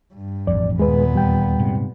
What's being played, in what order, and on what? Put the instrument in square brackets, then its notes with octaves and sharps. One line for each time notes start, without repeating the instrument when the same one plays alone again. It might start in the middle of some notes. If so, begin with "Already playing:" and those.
[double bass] G2
[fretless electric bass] A1 F2 [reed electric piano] D5
[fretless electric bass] D#2 [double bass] A#2 B3 [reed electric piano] G#3 B4
[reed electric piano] E2 G3 G5
[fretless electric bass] G#2 C3